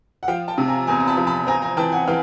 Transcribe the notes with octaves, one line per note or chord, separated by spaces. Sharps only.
F#5
F3 F5 G5
G5 A5
C3
G#5 A#5
E2 G#5 A#5
A#5
A5 B5
F3
A5 B5
C4 G#5 A#5
G#5 A#5
E3 G5 A5
F#5 G#5
E3 F5 G5